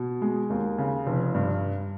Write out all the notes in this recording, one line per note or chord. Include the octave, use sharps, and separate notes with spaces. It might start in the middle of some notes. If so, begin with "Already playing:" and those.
Already playing: B2
G#3
D#2
C#3
F1
G2